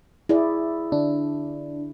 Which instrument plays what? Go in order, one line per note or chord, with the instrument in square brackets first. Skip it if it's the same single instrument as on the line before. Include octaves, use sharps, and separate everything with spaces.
[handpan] E4 G#4 D5
[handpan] D3 [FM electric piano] D4